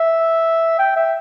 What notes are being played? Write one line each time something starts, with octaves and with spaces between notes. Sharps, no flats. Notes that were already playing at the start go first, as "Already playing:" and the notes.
Already playing: E5
G5
E5